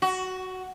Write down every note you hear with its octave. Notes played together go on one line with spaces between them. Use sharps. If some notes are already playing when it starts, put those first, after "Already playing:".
F#4